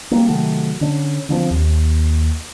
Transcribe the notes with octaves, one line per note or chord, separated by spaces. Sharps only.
G3 A#3
C3 D#3 F#3 A3
D3 C#4
D3 F3 G3 C4
D#2